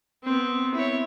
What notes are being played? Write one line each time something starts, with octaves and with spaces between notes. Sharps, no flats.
B3 C4
E4 C#5